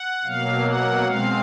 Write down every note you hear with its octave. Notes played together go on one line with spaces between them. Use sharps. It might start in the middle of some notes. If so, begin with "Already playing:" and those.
Already playing: F#5
B2 F#3 A#3 F5
F#5
B2 G#3 C4 F5